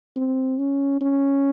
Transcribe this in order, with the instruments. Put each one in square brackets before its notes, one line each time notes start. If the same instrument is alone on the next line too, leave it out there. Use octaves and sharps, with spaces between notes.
[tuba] C4
C#4
C#4